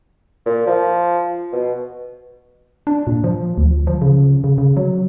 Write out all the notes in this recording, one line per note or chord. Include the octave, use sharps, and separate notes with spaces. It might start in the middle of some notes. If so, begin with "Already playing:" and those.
A#2
F3
B2
D4
A#2
F3
D2
F3
C#3
C#3
C#3
F#3